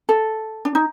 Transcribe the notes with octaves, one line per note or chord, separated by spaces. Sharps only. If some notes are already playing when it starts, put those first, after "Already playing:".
A4
D4
D#4